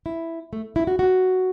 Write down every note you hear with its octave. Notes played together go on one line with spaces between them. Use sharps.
E4
A3
E4
F#4
F#4